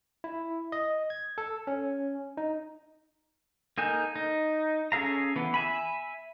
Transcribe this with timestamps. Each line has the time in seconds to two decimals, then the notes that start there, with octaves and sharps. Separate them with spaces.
0.24 E4
0.72 D#5
1.10 G#6
1.38 A4
1.67 C#4
2.37 D#4
3.78 A#3 D#4 A4 G#5 G6
4.16 D#4
4.92 C#4 G#4 A4 F5 A#5
5.36 E3 B3
5.54 E5 G#5 B5